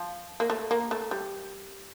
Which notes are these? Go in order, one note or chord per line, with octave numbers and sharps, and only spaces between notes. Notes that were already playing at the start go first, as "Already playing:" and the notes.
Already playing: F3
A#3
A3
A#3
A3
G3